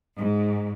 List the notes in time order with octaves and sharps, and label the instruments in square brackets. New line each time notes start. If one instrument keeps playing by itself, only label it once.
[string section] G#2